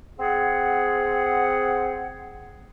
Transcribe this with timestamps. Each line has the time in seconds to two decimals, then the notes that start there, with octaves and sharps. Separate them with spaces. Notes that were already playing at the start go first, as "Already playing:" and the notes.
0.19 C4 G#4 F#5